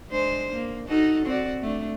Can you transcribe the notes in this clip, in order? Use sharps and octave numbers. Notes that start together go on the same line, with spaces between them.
G#3 D4 C5
A#3
D#4 F#4 A4
C4 F#4 D5
A3 D4